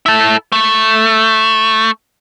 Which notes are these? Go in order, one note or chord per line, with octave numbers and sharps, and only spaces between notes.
E4 A4
A3